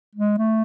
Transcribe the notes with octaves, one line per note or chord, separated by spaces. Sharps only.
G#3
A3